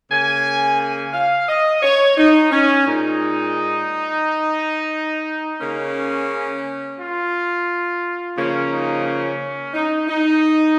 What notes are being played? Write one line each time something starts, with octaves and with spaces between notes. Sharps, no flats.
C#3 A#3 G#5
G#5
F5
D#5
C#5
D#4
C#4
A#2 G#3 D#4
C#3 A#3 C#4
F4
C#3 F3 A#3 C#4
D#4
C#4
D#4
D#4